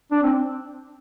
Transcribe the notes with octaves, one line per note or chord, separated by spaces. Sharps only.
D4
C4